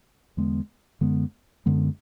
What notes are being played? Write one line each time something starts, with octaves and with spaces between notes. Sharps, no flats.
E2 D3 G#3 B3
F#2 D3 G#3 B3
F#2 D3 G#3 B3